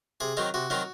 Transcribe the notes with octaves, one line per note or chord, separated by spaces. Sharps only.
C3 G#4
D#3 F#3 C4 D#4
C3 F#4
D#3 F#3 C4 D#4